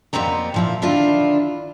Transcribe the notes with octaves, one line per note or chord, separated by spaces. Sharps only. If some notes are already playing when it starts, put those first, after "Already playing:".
F2 A#2 B3 C4 A#5
A#2 F3 E4
D3 D#3 D4 E4 F4